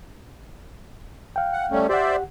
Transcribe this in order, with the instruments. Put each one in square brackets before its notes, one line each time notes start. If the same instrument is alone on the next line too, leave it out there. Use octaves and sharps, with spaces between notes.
[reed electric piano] F5 G5
[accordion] F#5
G3 A3 C#4
[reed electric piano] G4 F#5 [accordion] C5 D5 E5